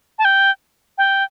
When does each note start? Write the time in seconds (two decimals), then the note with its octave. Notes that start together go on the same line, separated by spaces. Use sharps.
0.19 A5
0.25 G5
0.98 G5